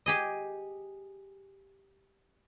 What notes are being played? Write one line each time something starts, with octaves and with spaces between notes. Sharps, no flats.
G4 G#4 D#5